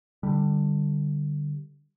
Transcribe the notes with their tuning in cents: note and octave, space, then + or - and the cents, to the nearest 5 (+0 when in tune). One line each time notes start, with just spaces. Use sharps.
D3 +15 G3 +0